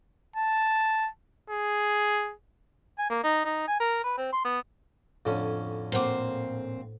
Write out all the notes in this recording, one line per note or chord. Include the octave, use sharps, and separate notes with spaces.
A5
G#4
G#5
A#3
D#4
D#4
G#5
A#4
B4
C4
C6
B3
F2 A2 D3 C#4
A#2 C4 C5 F#5 D6